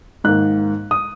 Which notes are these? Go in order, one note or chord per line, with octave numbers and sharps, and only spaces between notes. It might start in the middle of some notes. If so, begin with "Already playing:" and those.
G#2 D#3 A#3 F#6
D#6